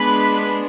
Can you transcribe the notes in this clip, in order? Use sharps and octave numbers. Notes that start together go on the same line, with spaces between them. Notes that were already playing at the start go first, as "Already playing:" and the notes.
Already playing: G#3 B3 D4 B4 B5